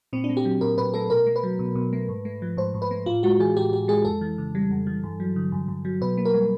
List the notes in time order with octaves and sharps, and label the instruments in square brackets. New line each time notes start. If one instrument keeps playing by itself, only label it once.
[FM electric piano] A#2 C4
D4
A3
G4
F#3
A#2 A#4
A#2 B4
A3 A4
B2 A#4
A3
B4
F#3
B2
B2
A3
G#2
A3
F3
G#2 C5
G#2
B4
A3
A2 F4
G#3 F#4
E3 G#4
A2 G4
A2 G4
G#3 G#4
F2 A4
E3
C#3
G3
F2
E3
G2
F#3
D3
G2
G2
F#3
B2 B4
A#3
A#4
G3